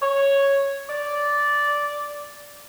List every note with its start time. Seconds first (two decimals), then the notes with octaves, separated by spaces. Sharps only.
0.02 C#5
0.89 D5